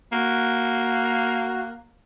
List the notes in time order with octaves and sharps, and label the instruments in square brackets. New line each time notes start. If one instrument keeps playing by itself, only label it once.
[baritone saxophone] A#3 [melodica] F#4